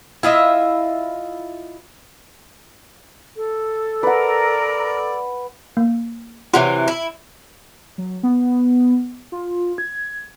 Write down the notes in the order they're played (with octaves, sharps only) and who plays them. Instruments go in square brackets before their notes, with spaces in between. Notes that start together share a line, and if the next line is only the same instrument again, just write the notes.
[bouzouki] E4 F4 D#5 E5
[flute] A4
[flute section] A#4 [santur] B4 F#5 [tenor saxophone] D5
[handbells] A#3
[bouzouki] C3 E3 F#3 [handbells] F4 F#5
[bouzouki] E4
[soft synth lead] F#3
B3
F4
G#6